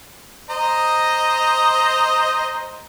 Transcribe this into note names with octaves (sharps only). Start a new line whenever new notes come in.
C5 D#5 A#5